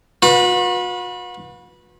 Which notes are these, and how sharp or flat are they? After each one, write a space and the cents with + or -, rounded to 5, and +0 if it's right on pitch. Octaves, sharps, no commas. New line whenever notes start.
F#4 -45 B4 -20